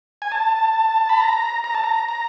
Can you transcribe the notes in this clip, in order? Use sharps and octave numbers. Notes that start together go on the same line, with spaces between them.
G#5
A5
B5
A#5
A#5
A5
A#5
A#5